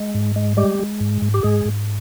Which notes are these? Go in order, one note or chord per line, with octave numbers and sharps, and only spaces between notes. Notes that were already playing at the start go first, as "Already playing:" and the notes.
Already playing: G#3
G#2
G#3
G3 G#3 G4
G#3
G#2
G#2
G4
G#2 G#3 G#4
G#2